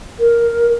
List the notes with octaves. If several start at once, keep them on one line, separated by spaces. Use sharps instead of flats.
A#4